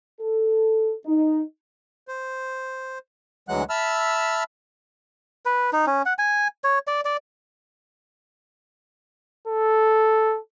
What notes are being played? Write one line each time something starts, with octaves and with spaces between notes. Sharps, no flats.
A4
D#4
C5
D2 E3 F#3 G#3 F#5 F#6
E5 A5 B5 E6 F6
B4
D#4
C#4
F#5
G#5
C#5
D5
D5
A4